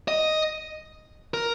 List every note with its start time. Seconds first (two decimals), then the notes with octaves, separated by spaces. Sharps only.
0.08 D#5
1.34 A#4